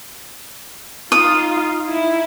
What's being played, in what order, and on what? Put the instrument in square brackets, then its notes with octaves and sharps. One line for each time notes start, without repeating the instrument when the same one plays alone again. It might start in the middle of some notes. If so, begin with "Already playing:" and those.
[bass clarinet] D#4 [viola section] F4 [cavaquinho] D#6
[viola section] E4